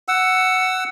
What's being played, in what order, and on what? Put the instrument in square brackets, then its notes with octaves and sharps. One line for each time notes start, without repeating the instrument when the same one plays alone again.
[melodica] F#5 E6